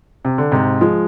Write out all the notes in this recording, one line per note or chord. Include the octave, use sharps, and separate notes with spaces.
C3
D3
G#2 C3
F3 G#3